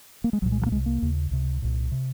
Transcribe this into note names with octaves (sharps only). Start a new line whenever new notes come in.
A#3
G#3
C2 A#2 F#3
G#3
F3
A#3
C2 C3 G#3
A#3
D#2 C#3
C#2 C3
C2 A#2
C3